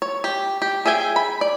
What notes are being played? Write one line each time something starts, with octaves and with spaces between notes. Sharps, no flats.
C#5
G4
G4
G#4 E5 G5 G#5
B5
D5